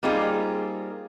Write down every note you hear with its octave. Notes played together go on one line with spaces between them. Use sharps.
G3 A#3 C4 D#4 F4 G#4